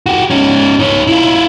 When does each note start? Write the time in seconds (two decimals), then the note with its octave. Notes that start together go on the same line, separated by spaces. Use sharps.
0.06 F#4 G4
0.30 C#4 D#4
0.79 D#4 C#5
1.07 E4 F4